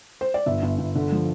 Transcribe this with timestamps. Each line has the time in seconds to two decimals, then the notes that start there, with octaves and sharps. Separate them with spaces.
0.21 C5
0.34 D5
0.46 G1 E5
0.63 G1
0.79 G1
0.95 D3
1.12 F3